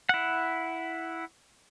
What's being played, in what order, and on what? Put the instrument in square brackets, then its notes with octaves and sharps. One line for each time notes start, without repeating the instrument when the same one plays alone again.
[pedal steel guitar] E4 F#5